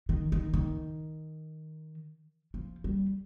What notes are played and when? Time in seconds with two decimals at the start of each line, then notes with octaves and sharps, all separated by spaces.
0.09 D#3
0.32 D#3
0.54 D#3
2.54 F3
2.84 G3